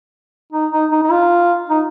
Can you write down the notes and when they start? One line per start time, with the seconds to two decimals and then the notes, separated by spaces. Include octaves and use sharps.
0.53 D#4
0.71 D#4
0.91 D#4
1.03 D#4
1.11 F4
1.70 D#4